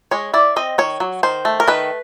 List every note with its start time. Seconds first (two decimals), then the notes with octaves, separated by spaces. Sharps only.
0.11 G#3 C#5
0.34 E4 D5
0.56 C4 D#5
0.78 D#3 C#5
1.00 F#3
1.23 D#3 C5
1.45 A3
1.60 A#4
1.68 D#3 B4